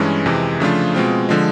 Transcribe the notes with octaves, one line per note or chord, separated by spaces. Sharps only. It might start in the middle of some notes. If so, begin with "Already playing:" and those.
Already playing: G2 E3 G#3 C#4
F2 C3 E3 G#3
C#3 F3 A3 D4 F4
B2 G#3 C4 F4
D3 F3 G#3